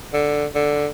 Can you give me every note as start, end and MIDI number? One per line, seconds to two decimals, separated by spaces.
0.14 0.46 50
0.55 0.88 50